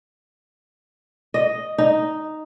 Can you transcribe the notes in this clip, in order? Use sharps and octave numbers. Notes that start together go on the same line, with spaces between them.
D#5
D#4